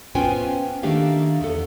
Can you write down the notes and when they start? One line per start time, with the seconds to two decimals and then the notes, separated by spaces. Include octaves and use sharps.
0.15 B3 C#4 F4 C5 G5 G#5
0.83 D#3 A3 A#3 D4 G4 F5
1.41 E2 B3 A4